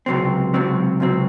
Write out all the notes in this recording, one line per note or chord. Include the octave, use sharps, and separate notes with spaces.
C#2 C3 F#3 C4
C#2 C3 F#3 C4
C#2 C3 F#3 C4